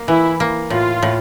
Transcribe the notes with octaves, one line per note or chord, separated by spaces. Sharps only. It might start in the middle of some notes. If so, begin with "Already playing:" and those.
Already playing: A#3
E3 E4
A#3
A2 F4
A2